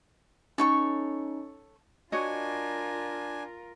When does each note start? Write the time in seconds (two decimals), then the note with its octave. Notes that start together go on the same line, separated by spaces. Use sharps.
0.58 C#4 D#4 A4 C#5 C#6
2.12 D4 F4 F#4 A#4 C#5 D#5 G#5